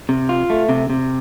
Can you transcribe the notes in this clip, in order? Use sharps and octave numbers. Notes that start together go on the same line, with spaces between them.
C3
F4
A3
C3
C3